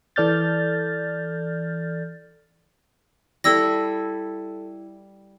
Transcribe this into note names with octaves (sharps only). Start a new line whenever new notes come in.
E3 A4 D5 F6 G6 A6
G3 E4 A4 E6 A#6